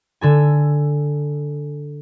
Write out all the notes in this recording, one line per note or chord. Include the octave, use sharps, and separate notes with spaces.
D3 A4 G#5